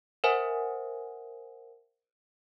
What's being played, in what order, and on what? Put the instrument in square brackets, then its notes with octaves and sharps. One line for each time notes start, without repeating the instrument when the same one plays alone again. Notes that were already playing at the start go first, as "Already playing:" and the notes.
[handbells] A#4 C5 E5 F#5 G#5